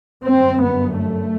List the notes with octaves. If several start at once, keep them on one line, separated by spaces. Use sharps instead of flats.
G1 F#2 C4
B3
A3